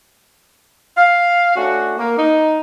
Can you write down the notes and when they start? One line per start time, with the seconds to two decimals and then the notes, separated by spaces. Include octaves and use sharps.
0.97 F5
1.56 A3 C#4 D4 F#4
1.98 A#3
2.17 D#4